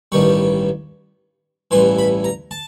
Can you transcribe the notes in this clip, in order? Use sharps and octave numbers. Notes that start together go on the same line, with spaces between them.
A1 G2 D#3 G3 C#6
A1 G2 E3 C6
B5
A#5
A5